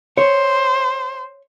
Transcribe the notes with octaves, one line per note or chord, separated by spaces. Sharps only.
C5 C#5